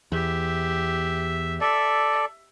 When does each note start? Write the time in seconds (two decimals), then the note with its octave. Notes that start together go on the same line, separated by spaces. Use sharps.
0.12 E2 G4 E5
1.61 A4 D5 E5